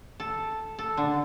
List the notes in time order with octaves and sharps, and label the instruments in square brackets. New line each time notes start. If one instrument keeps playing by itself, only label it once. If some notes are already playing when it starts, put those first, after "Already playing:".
[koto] A4
A4
D3